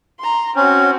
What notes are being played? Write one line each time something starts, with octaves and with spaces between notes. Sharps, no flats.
A#5 C6
C4 C#4 F#4